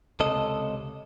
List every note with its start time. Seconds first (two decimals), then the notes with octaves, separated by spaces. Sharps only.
0.20 C#2 C3 A4 D#5